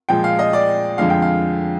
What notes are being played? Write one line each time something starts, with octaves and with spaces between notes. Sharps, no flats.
A#2 F3 G#3 G5
F5
D#5
D5
F2 D3 F3 G#3 F5
G5
F5